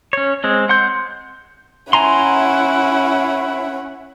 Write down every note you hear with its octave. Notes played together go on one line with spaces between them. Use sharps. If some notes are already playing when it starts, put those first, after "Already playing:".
C#4 C#5
G#3 C4
F#5 C6 G6
C#4 E4 F#5 G#5 A#5 C6